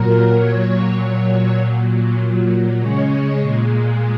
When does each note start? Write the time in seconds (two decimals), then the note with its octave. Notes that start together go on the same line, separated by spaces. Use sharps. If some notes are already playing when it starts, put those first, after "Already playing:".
Already playing: A#2 F#3 A#4
0.35 A#2 F#3 C#5
0.96 A#2 F#3 C#5
1.58 A#2 F#3
2.18 A#2 F#3
2.80 C#3 G#3 C#5
3.41 A#2 G#3